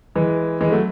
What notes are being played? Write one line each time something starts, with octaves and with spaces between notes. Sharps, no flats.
E3 G#3
E3 G#3
F#3 A3